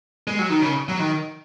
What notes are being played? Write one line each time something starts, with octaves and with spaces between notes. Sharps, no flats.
G#3
F#3
D#3
C#3
F#3
D#3